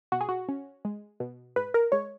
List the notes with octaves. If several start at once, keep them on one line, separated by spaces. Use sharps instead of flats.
B2 F#4
G#4
F#4
C#4
G#3
B2
G#2 B4
A#4
G#3 C#5